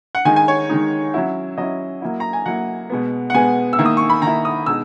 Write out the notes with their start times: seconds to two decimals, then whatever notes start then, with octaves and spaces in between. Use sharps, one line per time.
0.15 F#5
0.25 D#3 G#3 D#4 G#5
0.36 G#5
0.48 C#5
0.69 D#3 G#3 D#4
1.14 F#3 C#4 E4
1.58 F#3 C#4 E4 D#5
2.02 F#3 A#3 E4
2.20 A#5
2.33 G#5
2.46 F#3 A#3 E4 F#5
2.90 B2 G#3 B3
3.30 F#5
3.34 B2 G#3 B3 G#5
3.73 E6
3.78 D#3 A#3 E4
3.86 D#6
3.97 C#6
4.10 B5
4.22 D#3 A#3 E4 A#5
4.45 D#6
4.66 B2 G#3 D#4 E6